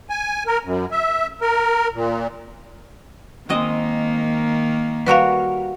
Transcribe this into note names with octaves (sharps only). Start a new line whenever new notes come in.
G#5
A#4
F#2
E5
A#4
A#2
D#3 G#3 A#3 C4 D#5
G3 F#4 A#4 B4 F5